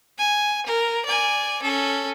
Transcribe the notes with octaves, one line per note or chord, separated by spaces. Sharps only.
G#5
A#4
D5 G#5
C#4 A4